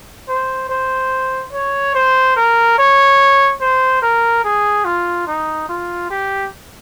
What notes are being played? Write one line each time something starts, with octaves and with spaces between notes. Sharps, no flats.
C5
C5
C#5
C5
A#4
C#5
C5
A#4
G#4
F4
D#4
F4
G4